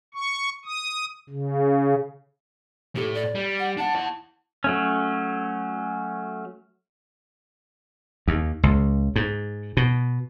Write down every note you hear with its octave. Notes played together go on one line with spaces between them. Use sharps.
C#6
D#6
C#3
A2 G4 A4
D5
G3
F#5
D4 F#5 A5
E4 F#5
F#3 A3 C#4
D#2
C#2
G#2
B2